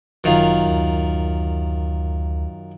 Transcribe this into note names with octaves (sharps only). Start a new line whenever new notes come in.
G1 F#2 D#3 F4
D2